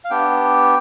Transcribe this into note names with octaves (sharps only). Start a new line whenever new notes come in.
F5
B3 D4 G4 G5